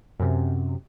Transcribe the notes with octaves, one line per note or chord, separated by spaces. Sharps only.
F#2 C3